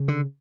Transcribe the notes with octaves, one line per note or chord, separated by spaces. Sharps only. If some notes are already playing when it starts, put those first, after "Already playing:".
Already playing: C#3
D3